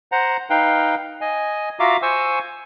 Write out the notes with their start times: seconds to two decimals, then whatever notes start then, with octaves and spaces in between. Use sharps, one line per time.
0.12 C5 F#5 A#5
0.50 D#4 B4 F5 G5
1.21 D#5 G#5
1.80 F4 F#4 E5 F5 A#5 D6
2.02 C5 G#5 C#6 E6